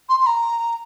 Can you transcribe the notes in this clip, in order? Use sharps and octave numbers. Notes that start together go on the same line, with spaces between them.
C6
C6
A#5